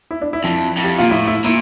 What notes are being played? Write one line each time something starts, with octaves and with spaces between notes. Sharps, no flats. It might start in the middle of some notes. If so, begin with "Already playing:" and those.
E4
D4
E4
F2
F2
G4
A#2 F4
A2 E4
E4
A#2 E4